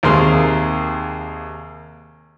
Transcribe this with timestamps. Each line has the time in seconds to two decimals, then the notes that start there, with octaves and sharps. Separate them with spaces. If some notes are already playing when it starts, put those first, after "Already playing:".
0.03 D#2 C3 A#3 G#4 C6